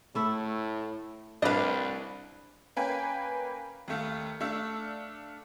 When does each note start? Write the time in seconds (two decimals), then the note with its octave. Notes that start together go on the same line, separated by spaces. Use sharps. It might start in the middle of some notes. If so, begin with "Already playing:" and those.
0.15 A2 A3 E4 E5
1.42 C2 D4 B4 D#5 F5
2.76 A#3 C#4 B4 G5 G#5
3.88 D#2 A3 F5
4.40 A3 D4 F5 E6